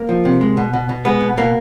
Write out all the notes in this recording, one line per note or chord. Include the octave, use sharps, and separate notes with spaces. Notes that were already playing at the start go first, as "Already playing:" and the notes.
Already playing: A#3
F3
C3
G#3
B2
B2
B2
G#3 B3
B2
B2 A#3